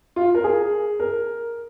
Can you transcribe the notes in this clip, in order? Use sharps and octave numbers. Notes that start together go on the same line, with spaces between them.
F4
A#4
G#4
A#4